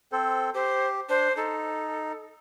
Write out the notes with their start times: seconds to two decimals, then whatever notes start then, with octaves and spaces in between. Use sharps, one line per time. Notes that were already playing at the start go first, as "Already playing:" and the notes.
0.12 C4 A4 C5
0.54 G4 C5
1.09 D4 C5
1.37 D#4 A4